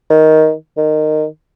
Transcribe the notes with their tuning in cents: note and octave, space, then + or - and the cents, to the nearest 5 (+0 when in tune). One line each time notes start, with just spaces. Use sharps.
D#3 +10
D#3 -15